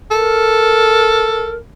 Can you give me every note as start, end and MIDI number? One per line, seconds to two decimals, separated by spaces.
0.11 1.55 69
0.11 1.55 70